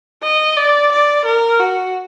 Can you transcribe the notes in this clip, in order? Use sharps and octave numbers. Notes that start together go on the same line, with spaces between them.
D#5
D5
D5
A#4
F#4